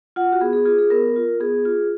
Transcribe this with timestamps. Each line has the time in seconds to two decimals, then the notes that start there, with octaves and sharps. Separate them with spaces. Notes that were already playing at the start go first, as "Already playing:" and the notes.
0.16 F4 F#5
0.33 F#4
0.41 B3 G#4
0.53 G#4
0.65 F4 G#4
0.78 G#4
0.90 B3 A#4
1.16 F4
1.40 B3 G#4
1.65 F4